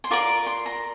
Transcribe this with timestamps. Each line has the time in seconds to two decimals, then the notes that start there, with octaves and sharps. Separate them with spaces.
0.04 C6
0.11 F4 A#4 D5 D6
0.46 C6
0.66 A#5